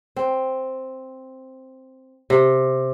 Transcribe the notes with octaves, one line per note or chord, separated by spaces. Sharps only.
C4
C3